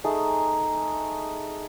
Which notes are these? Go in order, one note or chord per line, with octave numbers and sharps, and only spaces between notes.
A3 D#4 G#4